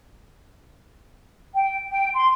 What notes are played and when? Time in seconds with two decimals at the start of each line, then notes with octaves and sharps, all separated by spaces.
1.55 G5
1.90 G5
2.14 C6